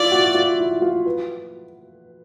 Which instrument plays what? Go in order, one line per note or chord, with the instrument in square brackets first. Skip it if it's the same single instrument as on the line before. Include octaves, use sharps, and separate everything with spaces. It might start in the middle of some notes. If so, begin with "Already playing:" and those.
Already playing: [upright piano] E4 F4 [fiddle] D5
[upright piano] F#4
F4
E4
F4
B4